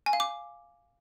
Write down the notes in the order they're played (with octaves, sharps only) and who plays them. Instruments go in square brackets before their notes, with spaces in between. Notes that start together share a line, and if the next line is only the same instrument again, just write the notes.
[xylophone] G#5
F5
D6